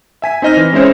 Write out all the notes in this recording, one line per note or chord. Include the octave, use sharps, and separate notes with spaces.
E5 G#5 B6
C4 D#4 D#5 F6 A#6
E3
G#3 C#4 E4 C5 C#5